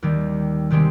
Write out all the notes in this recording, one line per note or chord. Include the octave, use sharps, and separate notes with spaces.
D#2 D#3 G3
C3 D#3 G#3 C4 G4